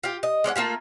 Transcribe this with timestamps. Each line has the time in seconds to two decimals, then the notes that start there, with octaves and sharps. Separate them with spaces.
0.04 F4 G4
0.23 D#5
0.44 G#3 C#4 D5 F#5
0.56 A3 A#3 F4 G4